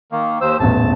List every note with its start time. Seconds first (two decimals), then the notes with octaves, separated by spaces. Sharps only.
0.12 D#3 A#3
0.41 D#2 C5 E6
0.60 D#1 A1 E2 A5